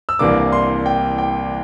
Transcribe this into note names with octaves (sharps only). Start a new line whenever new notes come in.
E6
C2 C3 E3 A#3 D4 D6
C6
G5
G5